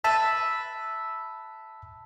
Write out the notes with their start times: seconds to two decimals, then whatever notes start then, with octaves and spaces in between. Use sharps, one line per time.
0.04 B4 E5 A5